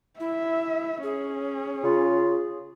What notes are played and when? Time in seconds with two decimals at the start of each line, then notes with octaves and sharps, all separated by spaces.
0.20 E4 E5
1.03 C#4 G#4
1.82 C#3 F4